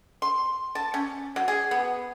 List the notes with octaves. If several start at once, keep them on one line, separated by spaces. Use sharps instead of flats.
C6
A5
C#4
F#3
G#4
B3